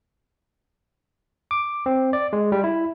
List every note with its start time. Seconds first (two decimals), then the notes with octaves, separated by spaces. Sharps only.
1.51 D6
1.86 C4
2.13 D5
2.33 G#3
2.52 G3
2.64 E4